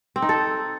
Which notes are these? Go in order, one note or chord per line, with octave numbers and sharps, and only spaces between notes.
C4
D#4
A4